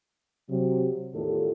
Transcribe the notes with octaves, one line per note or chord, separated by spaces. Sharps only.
C3 F#3
E2 A2 D#3 F4 G4 A4